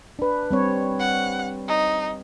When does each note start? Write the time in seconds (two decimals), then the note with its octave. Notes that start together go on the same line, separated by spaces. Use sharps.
0.19 D4 B4
0.51 G3 C4 C#5
1.00 F#5
1.68 D#4